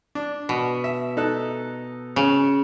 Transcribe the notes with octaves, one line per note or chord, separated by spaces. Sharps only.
D4
B2
E5
D#4 A4 F#6
C#3